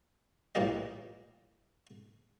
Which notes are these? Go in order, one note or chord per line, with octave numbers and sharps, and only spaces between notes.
A#1 A2 E3 A#3 G4 D#5